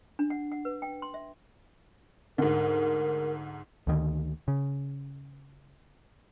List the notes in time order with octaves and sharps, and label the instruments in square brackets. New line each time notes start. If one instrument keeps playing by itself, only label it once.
[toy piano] D4
F#5
F#5
B4
G5
C6
E5
[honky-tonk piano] D2 G#2 [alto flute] A#4
[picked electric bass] D2 D#3
C#3